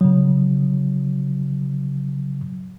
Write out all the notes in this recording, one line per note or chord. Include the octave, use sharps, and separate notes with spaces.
C#3 F#3